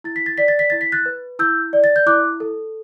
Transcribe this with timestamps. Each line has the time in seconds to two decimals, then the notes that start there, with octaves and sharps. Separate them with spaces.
0.04 E4 A6
0.16 B6
0.26 A6
0.38 D5 B6
0.48 A6
0.59 B6
0.70 E4 A6
0.81 B6
0.92 F#6 A6
1.06 B4
1.39 E4 E6 G6
1.73 D5
1.84 A6
1.96 G6
2.07 E4 D6 F#6
2.40 A4